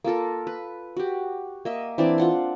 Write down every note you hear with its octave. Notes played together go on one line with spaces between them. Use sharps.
A#3 F4 A4 A#4
B4
F#4 G4
A#3 D#5 E5
E3 C4 D4 D5
F4 F#5 C6